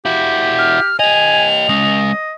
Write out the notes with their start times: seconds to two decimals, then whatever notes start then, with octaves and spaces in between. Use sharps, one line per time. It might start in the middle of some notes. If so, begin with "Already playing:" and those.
0.06 E4 F#4 G4
0.58 F6
0.99 G4 D#5 G#5 F7
1.69 G#3 C#4 D#5